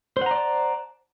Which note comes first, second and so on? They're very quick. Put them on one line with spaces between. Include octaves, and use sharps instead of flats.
C5 F#5 A#5 D5 A5